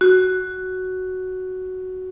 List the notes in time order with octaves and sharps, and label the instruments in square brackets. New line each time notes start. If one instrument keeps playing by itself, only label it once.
[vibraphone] F#4